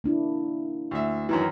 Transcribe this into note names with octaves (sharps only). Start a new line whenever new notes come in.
A#3 D4 E4
D2 E5
F#2 D#3 E3